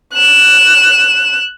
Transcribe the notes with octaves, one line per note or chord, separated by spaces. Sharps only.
F#6 E7